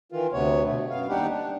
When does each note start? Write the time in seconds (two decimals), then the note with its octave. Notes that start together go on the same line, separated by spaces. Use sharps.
0.12 D#3 E3 F4
0.33 D2 C3 B3 C#5
0.64 B2 A3
0.90 F#2 B3 F5
1.09 D#2 G3 D4 D#4 G4 F#5
1.29 D4